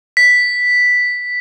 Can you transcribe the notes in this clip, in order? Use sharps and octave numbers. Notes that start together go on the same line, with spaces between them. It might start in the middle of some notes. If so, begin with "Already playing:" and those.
B6